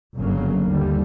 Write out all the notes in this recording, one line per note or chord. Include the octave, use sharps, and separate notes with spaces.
G1 F#2 C#3 F#3 A#3
D#2 D3 G3